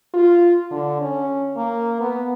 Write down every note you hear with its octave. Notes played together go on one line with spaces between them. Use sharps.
F4
D3
C#4
A#3
B3